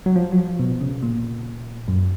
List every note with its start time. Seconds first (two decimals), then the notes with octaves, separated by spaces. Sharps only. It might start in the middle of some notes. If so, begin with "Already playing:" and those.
0.06 F#3
0.16 F3
0.32 F#3
0.38 F3
0.59 B2
0.81 C#3
1.03 A#2
1.88 F#2